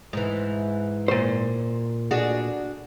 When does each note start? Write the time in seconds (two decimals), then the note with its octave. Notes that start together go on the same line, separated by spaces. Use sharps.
0.13 G#2 E3
1.08 A#2 C5
2.11 D4 F#4 G#4